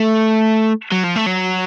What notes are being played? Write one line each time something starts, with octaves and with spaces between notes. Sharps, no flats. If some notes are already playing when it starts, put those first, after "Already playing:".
Already playing: A3
F#3
F3
A3
F#3